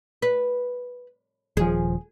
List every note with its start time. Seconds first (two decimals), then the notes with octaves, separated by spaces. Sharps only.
0.22 B4
1.57 D#1 F3 G#4